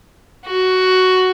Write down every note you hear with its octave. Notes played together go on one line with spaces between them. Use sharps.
F#4